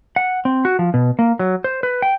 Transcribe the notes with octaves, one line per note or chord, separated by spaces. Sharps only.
F#5
C4
F#4
F3
B2
A#3
F#3
C5
B4
G5